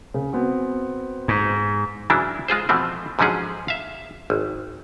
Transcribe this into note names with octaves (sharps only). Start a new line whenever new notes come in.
C#3
B3 C4 F#4
G#2
C#3 E3 F#3 D4 E4
G#3 F4 G#4 C5
B2 E3 F3 A3 C4
G#2 D3 F3 F#3 C#4 G#4
E5 F5
G#1